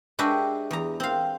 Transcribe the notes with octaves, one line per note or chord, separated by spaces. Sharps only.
G#3 D4 F#4 G4 B4 E5
E2 A#5
C4 F5